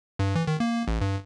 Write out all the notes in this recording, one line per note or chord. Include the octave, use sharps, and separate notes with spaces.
G2
E3
D#3
A#3
A1
G2